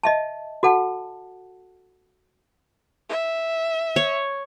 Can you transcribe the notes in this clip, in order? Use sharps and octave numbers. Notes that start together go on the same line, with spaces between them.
D#5 E5 A5
F#4 A4 F#5 A5
E5
C#5